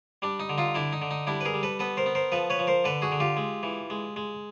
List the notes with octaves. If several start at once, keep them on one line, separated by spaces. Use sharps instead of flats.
G3 D4
D#4
D3
D#4 F4
D3 D4 E4
D#4
D3
D#4
G3 D4 E4
B4
G#4 A#4
G3
A4 B4
B3 A4 B4
A#4 C5
B3
A#4 C5
F3 A4 B4
B4 C#5
F3
A#4 C5
D3 A4 B4
F#4 G#4
D3
F4 G4
G#3
E3
G#3
G#3